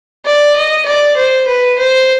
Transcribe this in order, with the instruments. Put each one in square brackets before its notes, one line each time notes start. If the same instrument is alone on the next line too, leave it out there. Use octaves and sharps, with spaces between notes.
[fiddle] D5
D#5
D5
C5
B4
C5